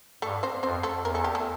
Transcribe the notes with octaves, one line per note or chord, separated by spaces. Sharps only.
G2 A3 A4
C4 C5
F2 C4 C5
A3 A4
E2 A#4
A4
G4
A3 A4